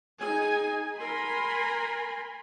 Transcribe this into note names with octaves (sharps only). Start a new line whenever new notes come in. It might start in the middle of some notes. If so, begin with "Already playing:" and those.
D#4 G#4 G#5
A#4 G#5 B5 C6